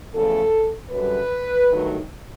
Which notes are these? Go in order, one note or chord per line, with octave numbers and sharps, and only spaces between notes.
E2 C#3 F3 A3 A4
F#2 D3 G3 B4
G2 D#3 F#3 A3